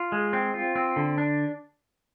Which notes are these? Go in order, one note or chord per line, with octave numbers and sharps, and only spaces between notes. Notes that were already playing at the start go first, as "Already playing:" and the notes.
Already playing: F4
G#3
C4
F4
C4
D3
D4